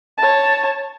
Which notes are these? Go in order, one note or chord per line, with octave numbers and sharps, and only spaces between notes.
C#5 A5